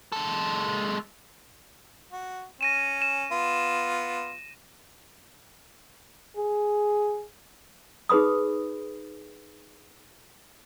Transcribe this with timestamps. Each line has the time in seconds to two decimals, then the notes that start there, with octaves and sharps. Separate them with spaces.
0.12 G#3 A4
2.12 F#4
2.61 C#4 A#6 D#7 E7
3.02 E7
3.32 B3 F4
6.37 G#4
8.09 D#4 G#4 B4 B5 D#6